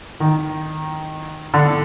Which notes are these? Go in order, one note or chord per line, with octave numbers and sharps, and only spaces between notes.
D#3
D3